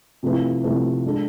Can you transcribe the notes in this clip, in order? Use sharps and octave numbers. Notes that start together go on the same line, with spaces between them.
C3 F3 A3 E4 B4
C3 F3 A3 E4 B4
G#3 D4 A4